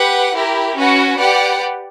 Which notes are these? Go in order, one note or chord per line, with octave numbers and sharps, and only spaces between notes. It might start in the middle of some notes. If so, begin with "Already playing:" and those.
Already playing: G4 B4 F#5
E4 G4 A#4
C#4 F#4 B4 F#5
G4 B4 D5 F#5